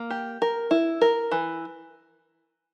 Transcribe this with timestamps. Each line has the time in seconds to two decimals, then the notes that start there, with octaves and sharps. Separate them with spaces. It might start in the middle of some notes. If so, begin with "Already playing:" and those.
Already playing: A#3
0.11 G4
0.42 A#4
0.71 E4
1.01 A#4
1.32 E3